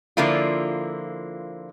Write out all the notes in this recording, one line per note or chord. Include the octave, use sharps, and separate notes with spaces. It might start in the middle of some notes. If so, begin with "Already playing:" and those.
D3 F3 A#3 E4 F4